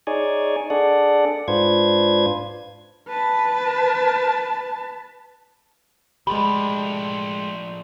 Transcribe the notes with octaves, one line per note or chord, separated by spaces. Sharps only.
D#4 G#4 C#5 D5 G#5
D4 G#4 A4 D5 F#5
G#2 D4 F4 B4 C5 G#6
B4 A5
F3 G#3 A3 D4 G4 B5